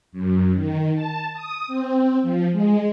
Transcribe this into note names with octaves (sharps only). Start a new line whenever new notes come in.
F#2
D#3
A5
D#6
C4
F3
G#3